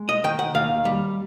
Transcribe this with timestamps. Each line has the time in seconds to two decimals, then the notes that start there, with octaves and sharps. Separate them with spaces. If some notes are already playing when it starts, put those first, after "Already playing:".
Already playing: G#3
0.09 D#5
0.24 D#3 G5
0.39 F#5
0.55 D#2 F5
0.85 G3